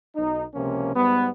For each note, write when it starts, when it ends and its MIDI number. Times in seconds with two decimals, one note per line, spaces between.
0.16 0.44 35
0.16 0.44 63
0.55 0.93 37
0.55 0.93 48
0.55 0.93 53
0.55 0.93 58
0.55 0.93 61
0.96 1.29 44
0.96 1.29 55
0.96 1.29 59